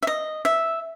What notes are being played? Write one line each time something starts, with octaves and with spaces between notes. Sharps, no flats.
E5
D#5
E5